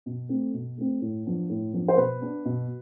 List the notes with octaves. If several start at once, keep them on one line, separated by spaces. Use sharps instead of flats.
B2
A3 C4
B2
A3 C4
A2
F3 B3 D4
A2
F3 B3 D4
C5
B2 B4
B3 D4
B2